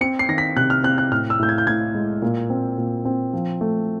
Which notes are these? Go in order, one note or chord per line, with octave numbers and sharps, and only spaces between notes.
C4 C#7
C7
D#3 A#6
B6
C3 F#6
F6
C4 F#6
F#6
A2 F6
E6
A2 G6
G#6
G6
A2 G#6
G#3
A#2
C4
A#2
C4
F3
A3